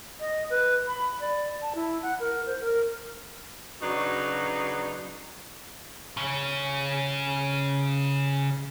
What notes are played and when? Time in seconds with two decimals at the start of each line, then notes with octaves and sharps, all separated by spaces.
0.20 D#5
0.50 B4
0.87 B5
1.20 D5
1.62 A5
1.75 E4
2.02 F#5
2.20 A#4
2.46 C5
2.61 A#4
3.82 C#3 F#3 D4 D#4 F#4 B4
6.17 C#3 C#4